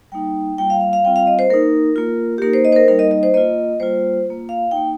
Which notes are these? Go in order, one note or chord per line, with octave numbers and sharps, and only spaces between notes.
G3 A#3 D#4 G5
G3 A#3 F4 G5
F5
F5
F5
G3 C4 F4 G5
F5
D#5
C5
A#3 D#4 A#4
A#3 F4
G4
A#3 D#4 A#4
C5
D#5
C5
A#4
G3 A#3 D#4 A#4
D#5
D#5
C5
A#3 F4 D#5
G3 A#3 F4 C5
A#3 F4
F5
D#4 G5
A#3